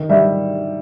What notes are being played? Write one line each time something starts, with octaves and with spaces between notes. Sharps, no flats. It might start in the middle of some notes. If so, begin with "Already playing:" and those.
Already playing: D#3
G3 E5